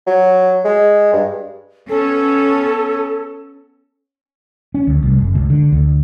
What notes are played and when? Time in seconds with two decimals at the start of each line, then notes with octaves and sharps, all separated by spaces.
0.07 F#3
0.65 G#3
1.13 G2
1.89 B3 C#4 A4
4.74 C#4
4.87 D2
5.03 C2
5.18 F#1
5.35 C#2
5.50 D3
5.72 D2